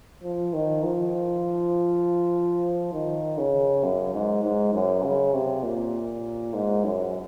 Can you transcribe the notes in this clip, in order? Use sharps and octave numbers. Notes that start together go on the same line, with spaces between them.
F3
D#3
F3
D#3
C#3
F#2
G#2
G#2
F#2
C#3
C3
A#2
G#2
F#2